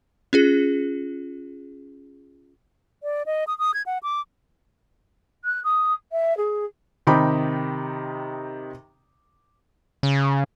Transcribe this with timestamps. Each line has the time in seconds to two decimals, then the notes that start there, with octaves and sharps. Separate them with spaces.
0.33 C#4 F4 G#4
3.03 D5
3.26 D#5
3.47 D#6
3.59 D#6
3.74 G#6
3.86 F#5
4.03 D6
5.44 F#6
5.64 D#6
6.12 E5
6.37 G#4
7.07 C3 D#3 D#4 G5 B5 D6
10.03 C#3